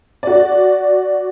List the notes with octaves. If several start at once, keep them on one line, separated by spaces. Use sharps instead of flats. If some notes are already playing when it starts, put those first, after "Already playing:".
F#4 D5